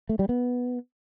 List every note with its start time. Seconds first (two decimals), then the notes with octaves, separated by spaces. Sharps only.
0.09 A3
0.19 G3
0.29 B3